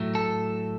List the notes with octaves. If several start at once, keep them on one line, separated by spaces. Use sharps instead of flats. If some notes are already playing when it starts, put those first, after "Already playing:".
Already playing: A2 F#3 A3
A4